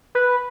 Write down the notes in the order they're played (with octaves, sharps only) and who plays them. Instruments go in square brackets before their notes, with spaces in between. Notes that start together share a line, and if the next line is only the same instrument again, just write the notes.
[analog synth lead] B4